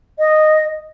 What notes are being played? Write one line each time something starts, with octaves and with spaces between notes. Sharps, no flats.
D#5